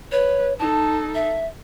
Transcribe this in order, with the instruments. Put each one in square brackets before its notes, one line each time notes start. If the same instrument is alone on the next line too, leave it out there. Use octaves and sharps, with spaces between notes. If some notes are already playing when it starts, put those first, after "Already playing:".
[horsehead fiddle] B4 [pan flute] C#5
[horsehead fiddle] D#4 A4 [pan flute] A5
[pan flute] E5